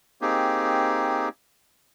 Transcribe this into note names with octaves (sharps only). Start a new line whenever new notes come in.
A#3 C4 D#4 G4 G#4